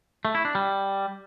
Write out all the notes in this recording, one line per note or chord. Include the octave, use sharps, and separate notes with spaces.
A3
E4
D4
G3